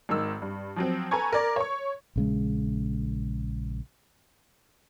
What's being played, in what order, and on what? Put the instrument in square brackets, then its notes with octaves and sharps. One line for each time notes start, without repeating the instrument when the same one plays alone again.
[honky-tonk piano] G#1 D#3 E6
G2
F3 F#3 C4
A4 B4 G#5 A#5 C#6 G#6
A#4 D5
C#5 C#6
[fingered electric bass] A#1 C#3 G#3